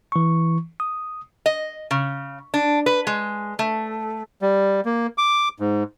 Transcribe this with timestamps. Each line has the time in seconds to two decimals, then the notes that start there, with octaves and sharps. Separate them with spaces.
0.12 E3 C#6
0.80 D#6
1.46 D#5
1.91 C#3
2.54 D4
2.86 B4
3.07 G#3
3.59 A3
4.42 G3
4.85 A#3
5.18 D6
5.60 G#2